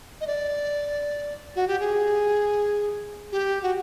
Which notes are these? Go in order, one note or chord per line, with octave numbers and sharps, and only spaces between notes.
D#5
D5
F#4
G4
G#4
G4
F#4